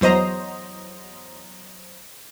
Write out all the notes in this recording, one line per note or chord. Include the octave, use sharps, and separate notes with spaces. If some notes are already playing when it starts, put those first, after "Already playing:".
E2 F#3 C5 D#5 A#5